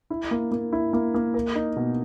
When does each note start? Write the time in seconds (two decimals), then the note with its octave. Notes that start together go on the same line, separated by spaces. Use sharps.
0.10 E4
0.31 A#3
0.51 A#3
0.73 E4
0.93 A#3
1.14 A#3
1.34 A#4
1.55 D#4
1.76 B2